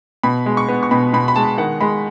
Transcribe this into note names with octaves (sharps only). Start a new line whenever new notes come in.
B2 B5
G#3
C#6
B3
C#6
B2 B5
B2 B5
B5
G#3 A5
D#3 F#5
G#3 B5